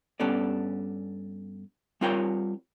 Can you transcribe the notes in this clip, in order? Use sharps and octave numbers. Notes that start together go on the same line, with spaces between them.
G2 B3 C#4 A4 D5
G3 C4 F4 A#4 C#5 G5